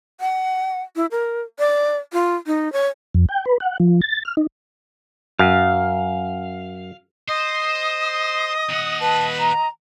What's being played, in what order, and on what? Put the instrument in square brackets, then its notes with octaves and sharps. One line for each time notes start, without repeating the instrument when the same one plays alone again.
[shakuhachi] F#5
E4
A#4
D5
F4
D#4
C#5
[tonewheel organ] F2
G5
B4
F#5
F3
A6
F6
D#4
[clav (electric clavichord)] F#2 [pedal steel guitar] F5
[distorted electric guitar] C5 [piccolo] D#5 [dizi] D#6
[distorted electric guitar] D#2 F#5
[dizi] B4 [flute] A5
[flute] A#5